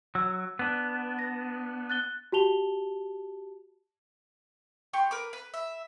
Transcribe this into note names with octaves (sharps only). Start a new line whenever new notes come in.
F#3 E6
B3 D4
A#6
F#6 A6 G7
F#4 G4 A5 F7 G7
G4 C6 C#6
A#4 B4 D6
B4
E5